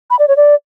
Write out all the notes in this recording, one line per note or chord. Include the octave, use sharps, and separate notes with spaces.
B5
D5
C#5
D5